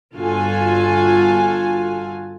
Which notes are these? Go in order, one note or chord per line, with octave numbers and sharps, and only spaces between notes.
G1 D3 F4 F#4 A4 G#5